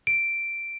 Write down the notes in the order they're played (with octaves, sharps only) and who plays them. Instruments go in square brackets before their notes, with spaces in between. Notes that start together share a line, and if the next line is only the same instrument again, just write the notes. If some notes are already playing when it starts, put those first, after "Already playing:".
[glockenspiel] D7